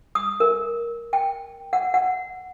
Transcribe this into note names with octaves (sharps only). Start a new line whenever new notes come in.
D#6
A#4
G5
F#5
F#5